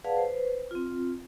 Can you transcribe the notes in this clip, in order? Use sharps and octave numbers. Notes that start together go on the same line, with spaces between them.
G#4 B4 D5 F5 F#5 A5
B4 C5
C4 F4